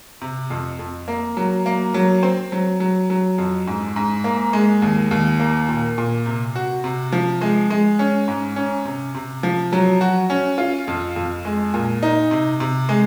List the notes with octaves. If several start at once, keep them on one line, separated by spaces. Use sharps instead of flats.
C3
F2
F2
A#3
F#3
A#3
F#3
C4
F#3
F#3
F#3
F2
G#2
G#2
A#3
G#3
D#2
D#2
A#3
A#2
A#2
C3
F#4
C3
F3
G#3
G#3
C#4
G#2
C#4
C3
C3
F3
F#3
F#4
C#4
F4
F2
F2
G#3
A#2
D#4
C3
C3
G#3